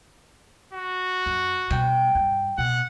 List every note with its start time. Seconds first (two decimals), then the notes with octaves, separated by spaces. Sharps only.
0.73 F#4
1.26 F#2
1.71 B2 G3 G5
2.15 G2
2.58 B2 F#5